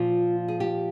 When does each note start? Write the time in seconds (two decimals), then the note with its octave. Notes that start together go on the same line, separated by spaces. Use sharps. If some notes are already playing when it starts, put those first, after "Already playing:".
Already playing: A#2 F3 F4
0.48 G#4
0.60 G4